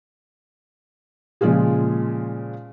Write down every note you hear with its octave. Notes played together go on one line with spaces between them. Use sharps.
A#2 C#3 F3 G#3 F4 G#4